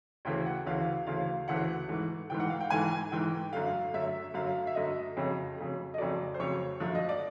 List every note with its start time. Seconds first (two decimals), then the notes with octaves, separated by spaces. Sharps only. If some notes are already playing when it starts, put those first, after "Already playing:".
0.25 D2 C#3 E3 A3 G5
0.46 F#5
0.66 D2 C#3 E3 A3 F5
1.06 D2 C#3 E3 A3 F5
1.48 D2 C#3 E3 A3 F#5
1.88 G#2 E3 A3
2.29 G#2 E3 A3 G5
2.40 F#5
2.50 F5
2.60 G5
2.70 G#2 E3 A3 G#5
3.12 G#2 E3 A3 G5
3.53 F#2 D3 F#3 A3 F5
3.94 F#2 D3 F#3 A3 E5
4.34 F#2 D3 F#3 A3 F5
4.67 E5
4.75 F#2 D3 F#3 A3 D#5
5.17 F2 C#3 F#3 A3
5.57 F2 C#3 F#3 A3
5.94 D#5
5.98 F2 C#3 F#3 A3 D5
6.34 C5
6.40 F2 C#3 F#3 A3 C#5
6.80 F#2 D3 F3 A3
6.95 D#5
7.09 D5